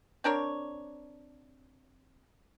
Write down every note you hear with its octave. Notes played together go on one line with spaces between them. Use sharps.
C4 D4 A#4 C#5